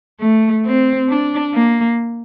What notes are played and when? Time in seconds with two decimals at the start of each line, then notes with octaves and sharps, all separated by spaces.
0.20 A3
0.65 C4
1.10 D4
1.54 A#3